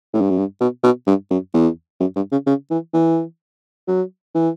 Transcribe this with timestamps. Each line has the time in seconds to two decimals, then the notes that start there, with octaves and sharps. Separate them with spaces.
0.13 A2
0.21 G2
0.29 F#2
0.37 G2
0.61 B2
0.83 B2
1.07 G2
1.30 F#2
1.54 E2
2.00 F#2
2.16 G2
2.32 C#3
2.47 C#3
2.71 E3
2.94 E3
3.88 F#3
4.35 E3